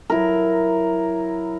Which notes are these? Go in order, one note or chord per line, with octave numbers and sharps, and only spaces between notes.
F#3 E4 A#4